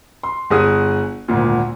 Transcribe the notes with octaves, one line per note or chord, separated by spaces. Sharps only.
C6
G1 G#4 D#6
G#1 D2 A#2